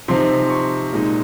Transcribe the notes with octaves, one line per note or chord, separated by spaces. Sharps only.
C3 F3 C4 D#4 C6
C#6
A#2 G#3 D#4